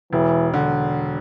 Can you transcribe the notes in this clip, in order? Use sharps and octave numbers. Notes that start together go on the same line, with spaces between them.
E1 E3
D3